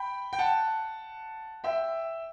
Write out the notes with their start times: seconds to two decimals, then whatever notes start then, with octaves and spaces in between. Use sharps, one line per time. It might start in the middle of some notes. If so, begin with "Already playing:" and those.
Already playing: G5 B5
0.33 G5
0.39 F#5 A5
1.64 E5 G5